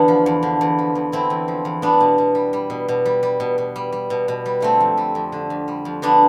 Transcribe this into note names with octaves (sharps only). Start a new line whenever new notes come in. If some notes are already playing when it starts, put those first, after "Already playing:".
Already playing: E2 D3 B3 D4
F3
E2
D3
E2
F3
E2
D3 C4 E4
E2
F3
E2
G3 B3 D4
B2
B2
G3
G3
B2
B2
G3
G3
B2
B2
G3
G3
B2
B2
G3
D3 A3 C4
F2
G3
F2
D3
F2
G3
F2
D3 B3 D4